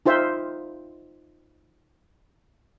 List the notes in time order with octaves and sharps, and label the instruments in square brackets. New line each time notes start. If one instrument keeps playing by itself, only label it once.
[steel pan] D#4 F4 C5 E5